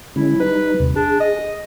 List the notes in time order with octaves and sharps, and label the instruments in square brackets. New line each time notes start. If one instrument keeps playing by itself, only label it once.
[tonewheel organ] D3 G#3 C#4 [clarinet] E4
[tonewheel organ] G3 D#4 [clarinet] B4
[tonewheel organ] D#2 C3
[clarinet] D4 [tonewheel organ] G#4
[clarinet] D#5